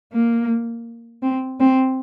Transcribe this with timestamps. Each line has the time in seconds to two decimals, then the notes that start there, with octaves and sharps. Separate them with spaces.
0.13 A#3
1.22 C4
1.60 C4